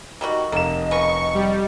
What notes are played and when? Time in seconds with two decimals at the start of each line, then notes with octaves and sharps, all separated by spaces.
0.21 D#3 G3 F#4 D#5
0.52 F1 A#3 E7
0.91 C#3 B3 A#4 C#6
1.34 G3